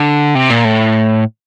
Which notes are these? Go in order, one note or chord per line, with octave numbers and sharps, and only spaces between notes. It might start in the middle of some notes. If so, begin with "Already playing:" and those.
Already playing: D3
C3
A#2
A2